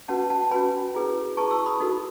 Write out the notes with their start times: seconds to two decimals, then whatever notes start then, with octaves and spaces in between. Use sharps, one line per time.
0.08 C#4 F#4 B4 F#5 A5
0.30 F#5 A5
0.51 C#4 F#4 B4 G#5 B5
0.94 E4 G#4 B4
1.37 E4 G#4 B4 A5 C#6
1.51 C#6 E6
1.66 B5 D#6
1.80 D#4 F#4 A4